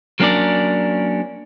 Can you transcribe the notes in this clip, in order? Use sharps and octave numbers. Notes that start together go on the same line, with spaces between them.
F#3 A#3 C#4 D4 A#4 D5